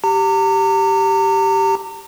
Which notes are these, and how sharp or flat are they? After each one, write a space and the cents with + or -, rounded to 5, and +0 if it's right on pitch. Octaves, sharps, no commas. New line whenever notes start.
G4 -5 A#5 -40